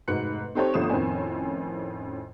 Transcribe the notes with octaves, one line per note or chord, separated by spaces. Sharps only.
F1 G#2 F#4 B4 F#6 C#7
C4 D#4 G4 A4 C5 C#5
G1 F3 A3 D#6 E7
F2 A2 D#3 C4 C#4 G#5